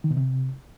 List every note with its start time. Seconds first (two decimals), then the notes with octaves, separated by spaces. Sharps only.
0.04 D#3
0.11 B2
0.17 C3